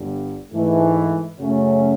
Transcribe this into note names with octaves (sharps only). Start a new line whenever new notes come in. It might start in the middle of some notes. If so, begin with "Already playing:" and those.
Already playing: G1 G2 D3
G#2 E3 A3
F#2 C#3 F#3 A3 C#4